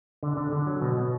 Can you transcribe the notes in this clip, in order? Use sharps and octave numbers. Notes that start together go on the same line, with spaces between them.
D3
D3
D3
F#3
B2
B2